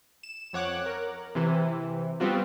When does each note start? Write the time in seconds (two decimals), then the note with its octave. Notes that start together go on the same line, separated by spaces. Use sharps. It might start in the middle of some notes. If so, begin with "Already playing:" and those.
0.23 E7
0.53 F2 C#5 F#5 D6 F#6
0.86 A#4
1.35 C3 E3
2.20 G3 B3 C4 F4 F#4